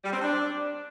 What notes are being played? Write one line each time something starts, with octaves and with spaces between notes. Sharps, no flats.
G3
C4
D4